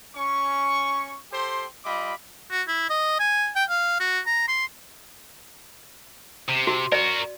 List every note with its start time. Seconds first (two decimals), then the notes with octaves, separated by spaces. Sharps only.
0.16 C#4 C#6
1.33 G4 A4 C5 G5 C6
1.85 G3 F4 D#5 B5 D6
2.51 F#4
2.68 E4
2.90 D#5
3.20 G#5
3.56 G5
3.70 F5
4.00 F#4
4.26 A#5
4.48 C6
6.48 C3
6.67 F#4
6.92 F#4 A#4 D5